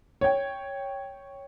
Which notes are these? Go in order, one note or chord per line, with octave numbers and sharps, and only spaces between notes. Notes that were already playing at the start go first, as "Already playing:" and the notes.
C#5 G5